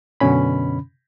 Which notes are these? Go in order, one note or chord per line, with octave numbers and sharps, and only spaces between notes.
F#2 B2 D3 C#4 B5